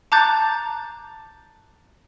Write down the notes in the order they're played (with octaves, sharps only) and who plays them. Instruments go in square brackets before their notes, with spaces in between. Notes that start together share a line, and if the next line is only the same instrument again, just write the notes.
[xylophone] A5 A#5 D6 F#6 G6 A6